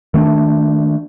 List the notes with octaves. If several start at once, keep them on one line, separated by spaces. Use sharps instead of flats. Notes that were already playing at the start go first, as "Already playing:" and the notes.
D#3 A3 C#4 D4